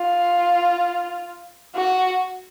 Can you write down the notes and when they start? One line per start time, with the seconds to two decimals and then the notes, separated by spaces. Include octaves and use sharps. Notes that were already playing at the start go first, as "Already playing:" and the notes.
Already playing: F4
1.75 F#4